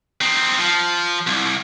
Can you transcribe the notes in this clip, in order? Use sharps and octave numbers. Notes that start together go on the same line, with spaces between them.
C4 D#4
F3
C2